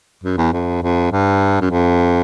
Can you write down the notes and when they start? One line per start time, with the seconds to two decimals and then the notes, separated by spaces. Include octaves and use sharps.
0.24 F#2
0.38 E2
0.53 F2
0.83 F2
1.12 G2
1.61 F#2
1.70 F2